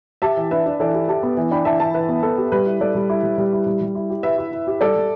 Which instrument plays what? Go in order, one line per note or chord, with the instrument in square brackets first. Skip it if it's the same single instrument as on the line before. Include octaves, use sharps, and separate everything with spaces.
[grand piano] G4 [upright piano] E5 A5
[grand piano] E3
[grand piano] D4 [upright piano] B4 E5
[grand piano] D4
[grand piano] E3 [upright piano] A4 D5
[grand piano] G4
[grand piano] G4 [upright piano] E5 A5
[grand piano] B3
E3
[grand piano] D4 [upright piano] G5 B5
[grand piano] E3 [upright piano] E5 A5
[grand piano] E3 [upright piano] E5 A5
[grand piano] E3 [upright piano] B4
[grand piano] B3
[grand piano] B3 [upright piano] A4
[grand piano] G4
[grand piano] G3 [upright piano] B4
[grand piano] E4
[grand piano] G3 [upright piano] A4 D5
[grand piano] G3
E4
G3
G3
E4
G3
G3
E4
G4
[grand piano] E4 [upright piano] B4 E5
[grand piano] E4
E4
G4
[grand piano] G3 [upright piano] A4 D5
[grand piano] G3